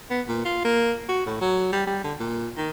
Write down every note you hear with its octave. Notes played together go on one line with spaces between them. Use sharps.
B3
A#2
F4
A#3
F#4
A2
F#3
G3
G3
D3
A#2
D#3